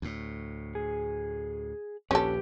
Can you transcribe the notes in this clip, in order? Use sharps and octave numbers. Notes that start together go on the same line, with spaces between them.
D2 A2
G#4
A#1 D#2 C#4 G4 A4 B4